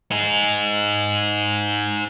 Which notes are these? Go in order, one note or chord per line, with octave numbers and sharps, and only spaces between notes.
D#4 G#4